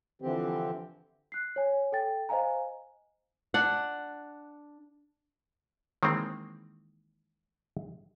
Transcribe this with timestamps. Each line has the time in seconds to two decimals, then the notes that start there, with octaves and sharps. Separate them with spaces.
0.22 D3 E3 F3 C4 G4
1.32 F#6 C7
1.56 C#5 G#5
1.92 A4 G5 A6
2.29 C5 D#5 F5 G#5 A#5
3.54 D4 F#5
6.03 D#3 E3 G#3 A#3 C4